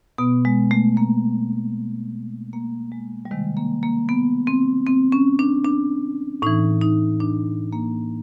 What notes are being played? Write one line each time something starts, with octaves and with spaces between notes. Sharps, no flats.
B2 B3
G#3
A3
A#3
A#3
G#3
G3
C3 D#3 G#3
A#3
A#3
B3
C4
C4
C#4
D4
D4
A2 E3 D#4
D#4
D4
A#3